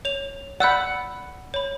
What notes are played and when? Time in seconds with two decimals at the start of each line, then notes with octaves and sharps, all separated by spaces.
0.05 C#5 F7
0.60 D5 F#5 B5 E6 G6
1.54 C#5 B5